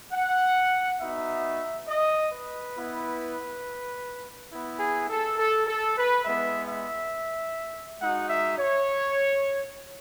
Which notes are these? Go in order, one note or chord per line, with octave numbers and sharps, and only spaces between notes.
F#5
B3 D#4 F#4 E5
D#5
B4
B3 E4
B3 E4
G#4
A4
A4
A4
B4
G#3 B3 E4 E5
E5
G#3 D#4 F#4 F#5
E5
C#5